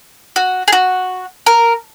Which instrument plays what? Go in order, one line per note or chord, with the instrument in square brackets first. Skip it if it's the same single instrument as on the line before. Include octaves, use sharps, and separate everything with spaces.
[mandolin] F#4
G#4
F#4
A#4